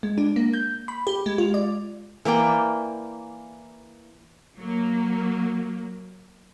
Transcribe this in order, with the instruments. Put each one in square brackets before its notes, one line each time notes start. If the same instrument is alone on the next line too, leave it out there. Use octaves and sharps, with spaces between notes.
[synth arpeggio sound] G#3
D4
A#3
G6
B5
G4
G#3
F4
D5
[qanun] E3 A#3 D5 G5
[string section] F#3 A#3